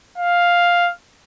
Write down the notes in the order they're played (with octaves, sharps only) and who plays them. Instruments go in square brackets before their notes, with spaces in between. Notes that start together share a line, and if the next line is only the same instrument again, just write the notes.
[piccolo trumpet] F5